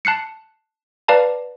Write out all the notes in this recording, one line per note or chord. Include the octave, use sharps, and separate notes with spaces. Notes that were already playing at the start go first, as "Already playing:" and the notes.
A5 F#6 C7 C#7
B4 D5 F5 A5 A#5